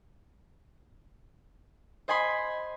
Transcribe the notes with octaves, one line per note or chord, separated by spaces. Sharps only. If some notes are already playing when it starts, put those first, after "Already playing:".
C5 D#5 G#5 B5 C6